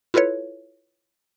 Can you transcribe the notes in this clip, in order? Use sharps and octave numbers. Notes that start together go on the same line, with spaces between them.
E4 F4 A4 B4 C#5